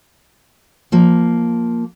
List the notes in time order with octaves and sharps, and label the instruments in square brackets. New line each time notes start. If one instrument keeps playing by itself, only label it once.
[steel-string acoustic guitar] F3 A#3